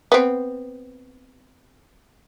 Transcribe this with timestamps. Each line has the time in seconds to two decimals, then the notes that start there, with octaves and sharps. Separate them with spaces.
0.12 B3 C4